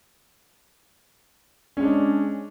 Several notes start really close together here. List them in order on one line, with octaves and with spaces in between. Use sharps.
C#4 G#3 D4